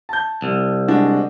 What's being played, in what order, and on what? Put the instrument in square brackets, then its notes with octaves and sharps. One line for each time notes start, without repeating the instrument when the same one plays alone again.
[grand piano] A5 G6
[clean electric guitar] C2
[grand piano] G#3 D4 F#4